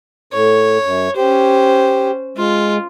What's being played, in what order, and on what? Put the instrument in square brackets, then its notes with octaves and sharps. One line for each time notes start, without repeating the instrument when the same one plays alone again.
[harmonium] A2 [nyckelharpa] C#5
[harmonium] F#2
[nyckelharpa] C#4 C5 [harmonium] G4
[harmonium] G#3 [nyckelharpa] F4